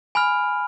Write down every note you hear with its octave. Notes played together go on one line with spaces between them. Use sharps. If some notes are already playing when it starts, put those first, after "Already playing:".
G#5 B5 F6